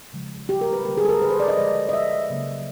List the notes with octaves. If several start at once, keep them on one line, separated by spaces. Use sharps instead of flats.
C#3 F3 G#3
G4
A#4
B4
D3 G3 A#3 A#4
G#4
A4
A#4
B4
C5
D5
D#5
D3 F3 G#3
D#5
E5
C#3 F#3 A#3